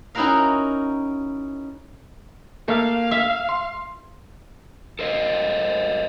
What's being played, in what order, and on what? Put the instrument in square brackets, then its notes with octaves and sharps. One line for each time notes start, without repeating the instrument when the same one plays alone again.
[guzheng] C#4 D#4 E4 F#4 A#4 F5
[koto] A3 [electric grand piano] A#3 [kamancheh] F5
[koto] E5
[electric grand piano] C6
[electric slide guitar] A4 A#4 C5 D#5